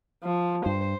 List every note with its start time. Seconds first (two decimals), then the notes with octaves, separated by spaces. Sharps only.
0.23 F3
0.66 G2 C5